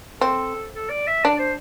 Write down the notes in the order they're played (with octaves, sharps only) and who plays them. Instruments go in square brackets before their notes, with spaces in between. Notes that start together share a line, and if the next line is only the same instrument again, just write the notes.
[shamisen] C4 [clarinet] A4
[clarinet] A4
D5
E5
[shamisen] D4 [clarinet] D5
[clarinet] C5